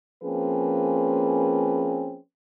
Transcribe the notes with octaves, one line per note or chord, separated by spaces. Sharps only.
F3 A#3 C4 C#4 G#4 B4